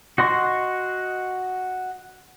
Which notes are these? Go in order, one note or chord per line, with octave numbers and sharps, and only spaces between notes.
F#4 D#5 C6 C#6